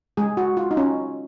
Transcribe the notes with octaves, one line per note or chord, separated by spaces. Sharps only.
G#3 G#4
F#4
F4
D#4
C#4